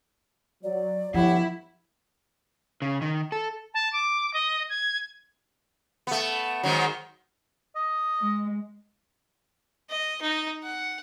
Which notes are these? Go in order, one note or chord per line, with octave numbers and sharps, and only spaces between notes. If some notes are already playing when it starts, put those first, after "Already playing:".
F#3 D5
G1 F3 E4 G4 C#5 F#5
C#3
D#3
A4
A5
D6
D#5
G#6
A3 B3
G#2 D#3 F#3
D#5
G#3
D#5
D#4
F#5